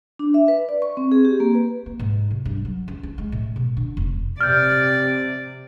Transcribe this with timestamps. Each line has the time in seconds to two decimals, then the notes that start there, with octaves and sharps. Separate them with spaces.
0.19 D4
0.34 E5
0.48 B4
0.69 D5
0.82 C#6
0.97 C4
1.12 G#4
1.25 G4
1.40 A#3
1.55 B4
1.86 A#3
1.99 G#2
2.31 C3
2.45 G2
2.65 F#3
2.88 C#2
3.03 E4
3.18 G#3
3.32 A2
3.56 B2
3.77 D3
3.97 F1
4.41 C3 D5 F6 G6